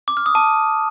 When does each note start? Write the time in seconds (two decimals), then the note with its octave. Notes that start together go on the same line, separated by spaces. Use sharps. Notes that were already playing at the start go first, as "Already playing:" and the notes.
0.08 D6
0.17 F6
0.26 D#6
0.35 A5